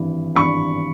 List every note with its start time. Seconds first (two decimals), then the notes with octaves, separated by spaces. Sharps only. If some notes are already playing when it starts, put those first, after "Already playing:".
Already playing: G#1 G2 E3
0.36 G#1 G2 E3 B5 C#6